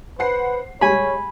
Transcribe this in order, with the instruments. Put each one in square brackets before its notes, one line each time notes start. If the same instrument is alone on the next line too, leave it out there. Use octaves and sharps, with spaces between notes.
[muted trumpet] B4 [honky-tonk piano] C5 F#5 C7
[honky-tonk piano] G3 G#3 [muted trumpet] C#5 [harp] G#5 B5